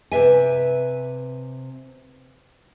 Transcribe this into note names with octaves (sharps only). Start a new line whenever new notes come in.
C3 B4 E5 G#5